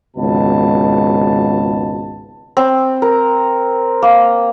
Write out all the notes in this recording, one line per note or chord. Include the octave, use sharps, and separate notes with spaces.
G#1 C#2 B2 A5
C4
A#4
A#3